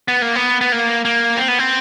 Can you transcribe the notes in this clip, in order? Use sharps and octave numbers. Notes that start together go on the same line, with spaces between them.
B3
A#3
B3
B3
A#3
A#3
C4
B3
C4